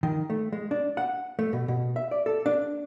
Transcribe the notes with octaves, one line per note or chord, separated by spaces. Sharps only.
D#3
A3
G#3
D4
F#5
A3
B2
B2
E5
D5
A4
D4